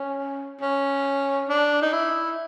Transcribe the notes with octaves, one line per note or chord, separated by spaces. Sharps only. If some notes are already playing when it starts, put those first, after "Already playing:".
Already playing: C#4
C#4
D4
D#4
E4